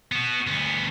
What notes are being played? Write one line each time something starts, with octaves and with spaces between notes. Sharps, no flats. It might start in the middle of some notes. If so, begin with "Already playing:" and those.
B3 F#4
D2 B3